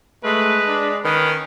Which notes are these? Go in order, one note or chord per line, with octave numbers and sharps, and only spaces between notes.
G#3 A3 B4
D4
D#3 C#4 B4